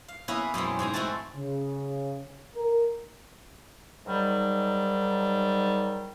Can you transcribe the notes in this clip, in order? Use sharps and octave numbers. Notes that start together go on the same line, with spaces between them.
F5
A#3 B3 C#4 E4 B4 A#5
F#2 B2 G#3 C4
G#2 C4 G#5 A#5
G#3 A3 C4 E4 F#4 A5
C#3
A#4
G#2 D#3 F#3 G3